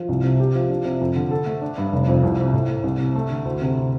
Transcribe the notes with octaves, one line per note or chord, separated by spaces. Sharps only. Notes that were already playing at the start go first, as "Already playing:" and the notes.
Already playing: F3
C2
C3
G4
F3
D4
C3
F2
D3
A4
A3
D4
G2
F1
F2
C2
C3
A2
A3
C2
C3
A3
D3
D2
C3